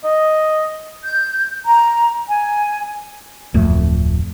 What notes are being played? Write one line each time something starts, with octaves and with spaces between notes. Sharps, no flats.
D#5
G6
A#5
G#5
D1 F2 A3